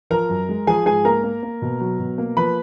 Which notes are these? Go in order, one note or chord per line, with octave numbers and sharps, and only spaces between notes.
F3 A#4 A#5
F#2
G#3
F3 G#4 G#5
G#2 G#4 G#5
A#3 A#4 A#5
A#3
A#3
B2
F#3
B2
A#3
F3 B4 B5